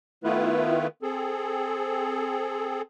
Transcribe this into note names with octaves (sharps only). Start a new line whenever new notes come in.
D#3 A3 B3 E4 F4 B4
C4 G#4 A4